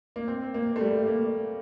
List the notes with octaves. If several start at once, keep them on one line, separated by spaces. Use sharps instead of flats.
A#3
C4
A#3
A3
G3
A#3